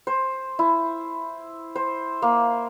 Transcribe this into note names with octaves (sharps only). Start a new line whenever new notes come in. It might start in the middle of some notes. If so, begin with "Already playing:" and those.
C5
E4
C5
A#3